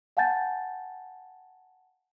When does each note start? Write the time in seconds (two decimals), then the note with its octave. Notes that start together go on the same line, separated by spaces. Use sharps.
0.17 F5 F#5 G#5 A5 G6 A6